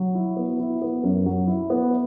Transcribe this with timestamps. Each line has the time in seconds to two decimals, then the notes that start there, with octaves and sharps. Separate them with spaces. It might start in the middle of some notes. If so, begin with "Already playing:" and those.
Already playing: F#3
0.15 E4
0.37 B3
0.59 E4
0.82 B3
1.03 F#2
1.26 F#3
1.47 E4
1.70 B3